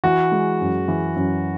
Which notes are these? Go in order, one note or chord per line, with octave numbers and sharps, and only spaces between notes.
E3 F#4
G#3
F#2
E3
F#2